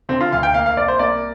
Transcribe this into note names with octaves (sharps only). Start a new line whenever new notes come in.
D3 C4
F4
D2 F5
G5
A#3 F5
F5
C2 D5
C5
A#3 D5